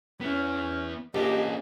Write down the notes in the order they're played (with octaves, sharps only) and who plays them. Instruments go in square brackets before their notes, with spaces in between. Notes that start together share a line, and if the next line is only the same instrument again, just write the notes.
[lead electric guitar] B3 E4 [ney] C#4
[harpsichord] A#1 [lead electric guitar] C#4 A4 [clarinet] G4 [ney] D#5